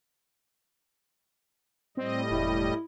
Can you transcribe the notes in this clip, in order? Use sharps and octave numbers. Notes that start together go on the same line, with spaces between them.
A2 G3 C4 D#5
E1 E4